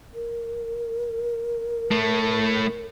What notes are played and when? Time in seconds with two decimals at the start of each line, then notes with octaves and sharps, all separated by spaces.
0.14 A#4
1.91 A2 A3